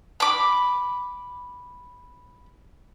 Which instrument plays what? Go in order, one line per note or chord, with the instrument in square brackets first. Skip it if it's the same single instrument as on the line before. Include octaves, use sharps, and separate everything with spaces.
[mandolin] B5 D6